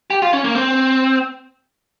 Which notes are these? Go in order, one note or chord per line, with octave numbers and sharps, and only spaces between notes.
G4
F4
C#4
A#3
C4